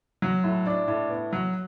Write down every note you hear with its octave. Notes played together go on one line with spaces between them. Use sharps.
F#3
A2
D4
A2
B3
F#3